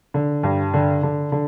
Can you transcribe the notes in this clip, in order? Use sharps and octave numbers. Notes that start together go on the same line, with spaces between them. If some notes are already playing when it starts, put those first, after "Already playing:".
D3
G2
D3
D3
D3